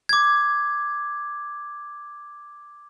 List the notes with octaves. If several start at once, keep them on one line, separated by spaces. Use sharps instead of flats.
D6 G#6